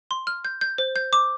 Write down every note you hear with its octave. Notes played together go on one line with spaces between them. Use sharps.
C6
F6
G6
G6
C5
G6
D6